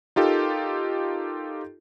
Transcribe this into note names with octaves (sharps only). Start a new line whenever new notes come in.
D#4 F4 G4 A4 A#4